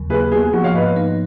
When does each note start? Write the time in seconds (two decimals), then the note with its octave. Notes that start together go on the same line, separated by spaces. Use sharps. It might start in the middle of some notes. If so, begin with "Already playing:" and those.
Already playing: D#2 C#3 F#3
0.10 A#3 G#4 B4
0.31 B3 G#4
0.42 G#4
0.53 F3 F#4
0.64 C#5 F5
0.74 G#2 B4 D#5
0.96 D#4